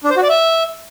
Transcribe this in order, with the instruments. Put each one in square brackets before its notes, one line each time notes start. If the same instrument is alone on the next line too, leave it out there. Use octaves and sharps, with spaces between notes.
[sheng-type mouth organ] D4
C5
F#4
D5
E5